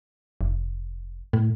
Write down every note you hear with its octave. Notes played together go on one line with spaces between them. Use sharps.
F1
A2